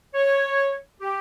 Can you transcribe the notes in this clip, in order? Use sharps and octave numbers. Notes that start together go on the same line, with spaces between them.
C#5
G4